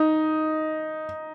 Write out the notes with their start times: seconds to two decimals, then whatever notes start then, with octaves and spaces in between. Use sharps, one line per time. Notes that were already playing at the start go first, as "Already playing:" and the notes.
Already playing: D#4